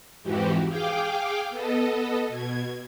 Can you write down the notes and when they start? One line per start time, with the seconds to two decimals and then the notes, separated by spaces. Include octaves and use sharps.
0.24 F2 G#2 E3 F#4 G4
0.68 G#4 F5 G5 D6
1.50 B3 A4 D#5
2.28 B2 G#6